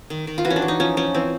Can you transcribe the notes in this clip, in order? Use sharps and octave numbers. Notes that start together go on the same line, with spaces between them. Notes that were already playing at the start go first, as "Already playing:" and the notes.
D#3
D#3
F4
E3 F#4
C#4
D4
E3
D#4
F3 C#4
F3 C#4
E3 C4